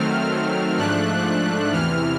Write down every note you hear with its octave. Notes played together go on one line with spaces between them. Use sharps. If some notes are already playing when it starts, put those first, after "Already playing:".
Already playing: D#3 F#3 A3 C4 F6
G#2 F3 A3 D4 F#6
E2 C3 E3 F6